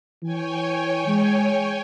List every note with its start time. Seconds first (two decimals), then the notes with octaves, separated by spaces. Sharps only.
0.23 E3 C#5 G5 G#5
1.07 G#3